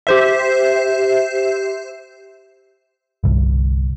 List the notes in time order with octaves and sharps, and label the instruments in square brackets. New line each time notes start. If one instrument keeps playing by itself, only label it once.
[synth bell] G4 C5 E5
[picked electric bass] G1 C2